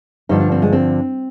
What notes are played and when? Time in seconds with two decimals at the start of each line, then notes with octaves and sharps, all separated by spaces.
0.29 G2 D3 F3 D#4
0.40 D4
0.52 C4
0.62 G#3
0.72 C4